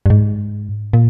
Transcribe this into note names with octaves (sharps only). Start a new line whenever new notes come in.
G2
G#2
A#2